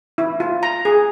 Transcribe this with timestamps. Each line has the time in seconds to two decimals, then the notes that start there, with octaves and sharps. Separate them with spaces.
0.18 E4
0.40 F4
0.63 A#5
0.85 G#4